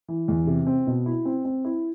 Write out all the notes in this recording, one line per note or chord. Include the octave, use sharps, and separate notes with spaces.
E3
E2
C3
C4
B2
E4
C4
C4
E4